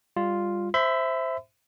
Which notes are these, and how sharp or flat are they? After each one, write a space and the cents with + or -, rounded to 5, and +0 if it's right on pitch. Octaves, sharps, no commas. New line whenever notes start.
G3 +20 F4 +0
C5 +0 E5 +0 B5 +40